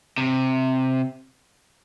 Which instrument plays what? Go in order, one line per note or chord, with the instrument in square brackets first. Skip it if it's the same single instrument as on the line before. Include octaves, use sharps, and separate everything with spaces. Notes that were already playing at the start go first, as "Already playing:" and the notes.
[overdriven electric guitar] C3